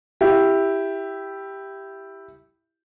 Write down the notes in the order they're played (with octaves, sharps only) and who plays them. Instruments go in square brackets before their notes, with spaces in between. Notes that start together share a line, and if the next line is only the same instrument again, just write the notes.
[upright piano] E4 G4